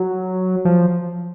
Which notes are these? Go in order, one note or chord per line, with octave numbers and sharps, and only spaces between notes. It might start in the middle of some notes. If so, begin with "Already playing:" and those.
Already playing: F#3
F3